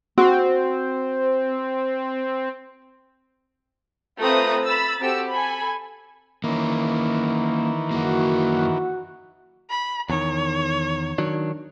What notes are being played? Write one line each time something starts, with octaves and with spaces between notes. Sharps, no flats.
C4 F#4
A3 C4 F4 B4 A#5 D#6
B5 E6 A6
C4 F#4 G4 A4 E6
A4 G#5 B5
D#3 E3 A#3 C#4
F#2 A#3 F#4
B5
E2 D#3 C#5
D#3 F#3 D4